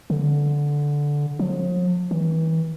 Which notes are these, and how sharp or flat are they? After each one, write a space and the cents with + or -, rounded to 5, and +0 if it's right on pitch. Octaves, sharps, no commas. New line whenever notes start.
D3 -10
F3 +45
E3 -35